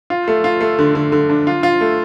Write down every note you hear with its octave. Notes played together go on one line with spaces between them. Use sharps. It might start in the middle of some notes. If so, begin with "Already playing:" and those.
F4
A3
F4
A3
D3
D3
D3
D4
F4
F4
A3